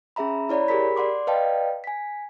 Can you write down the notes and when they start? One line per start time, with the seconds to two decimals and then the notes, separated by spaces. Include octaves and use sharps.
0.16 C#4 G#4 E5 A#5 B5
0.49 E4 C#5 D5 A#5 B5
0.68 G4 G#4 A#4 B5 B6
0.96 D5 F#5 C6 D6
1.27 B4 D5 D#5 F5 G5 A5
1.84 G#5 B6